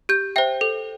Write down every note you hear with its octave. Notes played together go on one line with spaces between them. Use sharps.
G4 G6
C5 E5 G5
A4